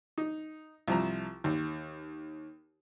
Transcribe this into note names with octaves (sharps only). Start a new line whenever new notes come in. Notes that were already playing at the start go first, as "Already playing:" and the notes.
D#4
C2 F3 A#5
D#2